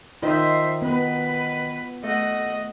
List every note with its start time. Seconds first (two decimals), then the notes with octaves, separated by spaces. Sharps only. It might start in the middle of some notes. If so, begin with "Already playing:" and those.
0.22 D#3 F4 C5 D#5 E5
0.82 B3 B4
2.03 A3 D#5 F#5